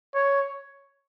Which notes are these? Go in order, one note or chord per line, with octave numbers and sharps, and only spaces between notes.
C#5